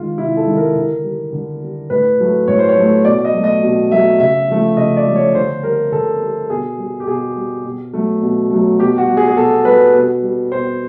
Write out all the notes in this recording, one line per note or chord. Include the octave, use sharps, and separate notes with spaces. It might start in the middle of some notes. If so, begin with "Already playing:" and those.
Already playing: D#3 G#3 F4
C3 E4
A4
D#3 G#3
A#4
D3
G3
D3
G3
A2 B4
F#3 A3
A2 C#5
C5
C#5
F#3 A3
B2 D5
D#5
F#3 A3
D#5
B2
F#3 A3 E5
C#3 E5
F3 A3
C#3 D#5
D5
F3 A3
C#5
D3 C5
G3 A#4
D3 A4
G3
B2 G#4
G3
G4
B2 G#4
G3
B2
F#3 A3
B2
F#3 A3
B2 G4
F#4
G3
G#4
G#4
B2 A4
G3 B4
B2
G3
B2 C5